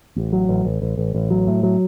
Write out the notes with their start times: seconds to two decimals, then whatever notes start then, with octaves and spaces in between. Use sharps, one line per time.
0.16 A1
0.33 F#3
0.49 A1
0.65 A1
0.82 A1
0.97 A1
1.14 A1
1.30 F#3
1.48 A2
1.63 F#3